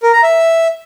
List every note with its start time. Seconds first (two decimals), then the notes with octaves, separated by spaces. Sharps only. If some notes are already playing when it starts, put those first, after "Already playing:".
0.03 A#4
0.13 A#5
0.23 E5